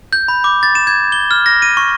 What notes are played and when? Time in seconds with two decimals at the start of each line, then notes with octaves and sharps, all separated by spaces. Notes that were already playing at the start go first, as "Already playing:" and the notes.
0.13 G6
0.28 B5
0.44 D6
0.63 A6
0.75 E7
0.87 G#6
1.12 G7
1.31 F6
1.46 A#6
1.62 D#7
1.77 C#6